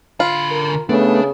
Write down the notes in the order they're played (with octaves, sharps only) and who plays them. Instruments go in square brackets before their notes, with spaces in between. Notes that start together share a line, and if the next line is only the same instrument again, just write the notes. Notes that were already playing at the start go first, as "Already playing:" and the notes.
[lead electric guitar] D3 B5 [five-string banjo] F4
[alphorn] A#4
[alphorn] C#3 [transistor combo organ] A3 B3 [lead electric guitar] D4